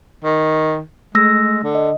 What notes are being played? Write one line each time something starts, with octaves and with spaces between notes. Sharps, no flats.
D#3
G#3 A3 E6 A#6
D3
D#5